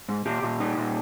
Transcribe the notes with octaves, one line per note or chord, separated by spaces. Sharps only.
G#2
A#2 G4
A#2
D#4
A#2